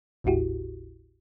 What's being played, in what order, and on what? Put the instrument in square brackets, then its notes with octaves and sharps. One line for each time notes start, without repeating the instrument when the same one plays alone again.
[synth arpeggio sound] G#1 D#2 A2 E4 F#4 G4